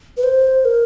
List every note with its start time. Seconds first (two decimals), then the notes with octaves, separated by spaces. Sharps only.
0.17 B4
0.23 C5
0.65 A#4